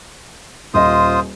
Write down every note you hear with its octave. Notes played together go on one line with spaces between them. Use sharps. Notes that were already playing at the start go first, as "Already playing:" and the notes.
D#1 F4 C5 D#5 D#6